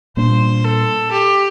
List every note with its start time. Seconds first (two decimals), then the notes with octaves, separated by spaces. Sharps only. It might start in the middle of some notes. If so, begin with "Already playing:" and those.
0.17 A#2 G3 A#3 D4 C5
0.64 A4
1.11 G4